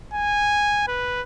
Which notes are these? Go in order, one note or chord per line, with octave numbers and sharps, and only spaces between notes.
G#5
B4